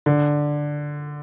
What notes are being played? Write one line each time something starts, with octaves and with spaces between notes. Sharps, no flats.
D3